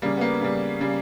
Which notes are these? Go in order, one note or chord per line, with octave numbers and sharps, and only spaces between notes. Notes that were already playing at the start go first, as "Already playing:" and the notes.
C#3 G3 A#3
B3
A#3
C#3 G3
C#3 G3